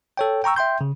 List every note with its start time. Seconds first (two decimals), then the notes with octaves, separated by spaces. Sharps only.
0.17 A4 C#5 G5
0.44 G5 A#5 C#6 E6
0.56 E5 G5 C6 G6
0.81 C#3